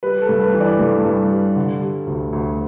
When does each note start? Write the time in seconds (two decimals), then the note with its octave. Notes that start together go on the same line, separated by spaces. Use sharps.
0.03 G3 B4
0.22 A4
0.29 G2
0.41 B4
0.54 E3
0.60 D5
0.79 G2 A4
1.05 G2
1.31 G3
1.56 D3
1.82 G3
2.07 D2
2.33 D2